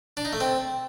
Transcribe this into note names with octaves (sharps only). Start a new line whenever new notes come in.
D4
D#4
A3
C4